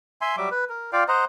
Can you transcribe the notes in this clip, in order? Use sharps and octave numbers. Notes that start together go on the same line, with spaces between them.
E5 G#5 C6
F#3 G3 E5 D6
B4
A#4
F4 D5 F5 G5
C5 D#5 F#5 A#5